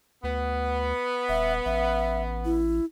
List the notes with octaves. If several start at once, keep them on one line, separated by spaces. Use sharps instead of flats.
D2 B3
D#1 E5
A1 E5
E4